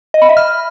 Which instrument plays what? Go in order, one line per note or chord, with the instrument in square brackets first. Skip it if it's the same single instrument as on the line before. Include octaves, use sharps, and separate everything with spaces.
[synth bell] D#5
B5
E5
F6